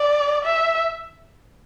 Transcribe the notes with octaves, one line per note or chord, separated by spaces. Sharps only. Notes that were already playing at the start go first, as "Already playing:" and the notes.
Already playing: D5
E5